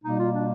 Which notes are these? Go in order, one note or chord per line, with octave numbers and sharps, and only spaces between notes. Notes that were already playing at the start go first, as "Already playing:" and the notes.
B2 G3 A#3 D#4
F4
D4